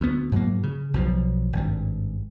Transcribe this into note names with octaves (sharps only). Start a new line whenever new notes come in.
D2 B3
G#2 F#3 A#3
C#3
B1 B2 F3
G#1 G2